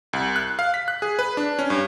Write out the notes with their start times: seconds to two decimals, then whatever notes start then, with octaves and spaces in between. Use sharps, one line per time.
0.13 C2
0.36 F#6
0.59 F5
0.74 B6
0.88 F#6
1.02 G#4
1.19 B4
1.37 D4
1.59 C#4
1.70 G2